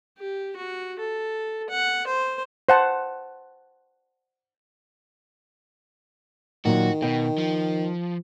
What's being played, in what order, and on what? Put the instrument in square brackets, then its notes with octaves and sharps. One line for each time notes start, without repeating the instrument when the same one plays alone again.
[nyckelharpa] G4
F#4
A4
F#5
C5
[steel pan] C5 F#5 A5
[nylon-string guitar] A#2 F#3 [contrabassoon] D#3 [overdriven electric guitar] F#4
[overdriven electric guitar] B2 [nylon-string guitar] G5
[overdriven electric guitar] F3